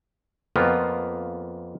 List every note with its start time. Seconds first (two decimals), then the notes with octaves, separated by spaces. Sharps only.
0.56 F2 A#3 B3 F4